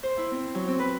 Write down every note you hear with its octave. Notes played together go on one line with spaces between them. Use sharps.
C5
E4
C4
F#3
C4
B4